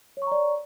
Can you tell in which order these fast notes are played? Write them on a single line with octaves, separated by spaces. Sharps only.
C#5 C#6 A#5 D5